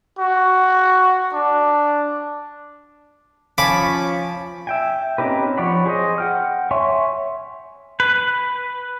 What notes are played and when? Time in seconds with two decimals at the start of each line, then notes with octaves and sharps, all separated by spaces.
0.19 F#4
1.34 D4
3.58 F3 C#4 B5 D6
4.67 E5 G5 G#5
5.18 C4 C#4 D#4 G4 B4
5.58 F3 C#5 D5 F#5 B5
5.86 G#4 C5 D#5
6.18 F#5 G5 F6
6.71 C#5 E5 G#5 C6 C#6
8.00 B4